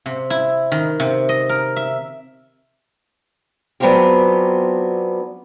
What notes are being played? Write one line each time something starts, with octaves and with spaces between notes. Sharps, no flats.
C3
E4
D#3
C3
D#5
A#4
E5
F#3 B3 C4 D4 F4 G4